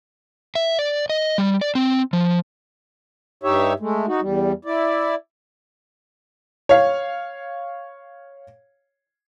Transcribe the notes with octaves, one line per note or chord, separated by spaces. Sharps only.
E5
D5
D#5
G3
D5
C4
F3
G2 D#4 G4 C#5 E5
G#3 A3
D#4 F#4
E2 G3
E4 D5
C#5 F5